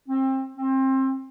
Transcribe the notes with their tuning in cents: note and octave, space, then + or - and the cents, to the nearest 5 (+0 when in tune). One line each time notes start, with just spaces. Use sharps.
C4 +25
C4 +25